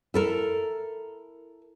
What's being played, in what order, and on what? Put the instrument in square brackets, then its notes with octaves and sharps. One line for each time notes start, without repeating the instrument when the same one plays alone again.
[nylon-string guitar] E4 A4 A#4